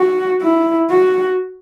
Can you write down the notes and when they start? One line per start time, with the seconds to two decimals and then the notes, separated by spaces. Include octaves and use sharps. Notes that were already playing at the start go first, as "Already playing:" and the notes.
Already playing: F#4
0.41 E4
0.90 F#4